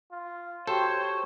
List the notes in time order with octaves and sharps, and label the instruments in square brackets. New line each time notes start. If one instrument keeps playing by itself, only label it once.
[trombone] F4
[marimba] F#4 G4 G5 [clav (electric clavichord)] A4 [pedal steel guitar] C5 [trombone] C#5